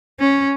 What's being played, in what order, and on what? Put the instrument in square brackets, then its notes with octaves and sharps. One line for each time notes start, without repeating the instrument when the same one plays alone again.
[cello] C#4